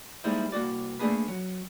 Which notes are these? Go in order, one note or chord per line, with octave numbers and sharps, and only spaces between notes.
G3 G#3 A#3 D#4 E4 C5
C2 A#3 F#4 D5
A3 A#3 C#4 D4 G#4 B4
F#3